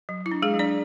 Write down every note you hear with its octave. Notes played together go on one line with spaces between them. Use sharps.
F#3
E4
D4
G#3 G#4
F#3
D4 D5